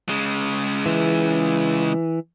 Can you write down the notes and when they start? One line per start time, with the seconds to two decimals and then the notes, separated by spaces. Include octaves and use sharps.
0.09 C#3 G#3
0.86 E3